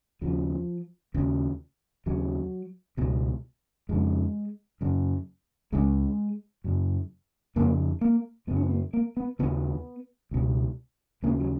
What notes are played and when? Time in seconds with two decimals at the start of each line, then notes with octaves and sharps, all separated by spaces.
0.21 D#2 C#3 F3
1.14 D#2 C#3
2.06 D#2 C#3 F#3
2.97 C#2 B2
3.89 F2 C#3 G#3
4.81 F#2 C#3
5.72 C#2 C#3 G#3
6.64 F#2 C#3
7.56 F2 C#3 A#3
8.01 A#3
8.47 F#2 C#3 B3
8.56 C#4
8.63 B3
8.70 A#3
8.93 A#3
9.17 B3
9.39 D#2 C#3 B3
10.31 C#2 B2
11.22 D#2 C#3 A#3
11.40 F#3